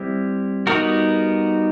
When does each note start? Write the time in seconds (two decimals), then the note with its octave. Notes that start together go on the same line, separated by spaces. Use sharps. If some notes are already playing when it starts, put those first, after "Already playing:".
Already playing: G3 C4 E4
0.67 G3 B3 D#4 F#4 A#4